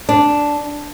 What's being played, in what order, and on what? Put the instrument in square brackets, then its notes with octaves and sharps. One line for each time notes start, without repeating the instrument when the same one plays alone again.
[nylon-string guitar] D4